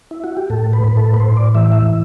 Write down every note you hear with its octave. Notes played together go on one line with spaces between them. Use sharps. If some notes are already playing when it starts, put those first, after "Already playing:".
E4
F#4
G4
A2 A4
B4
A2 B4
A4
B4
A2 C5
D5
E3 E5
E5